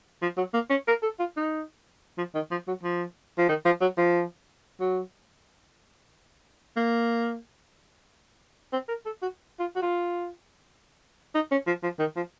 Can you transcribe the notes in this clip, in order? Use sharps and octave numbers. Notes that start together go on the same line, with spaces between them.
F3
F#3
A#3
C#4
A#4
A4
F4
D#4
F3
D#3
F3
F#3
F3
F3
D#3
F3
F#3
F3
F#3
A#3
C4
A#4
A4
F#4
F4
F#4
F4
D#4
C#4
F3
F3
D#3
F3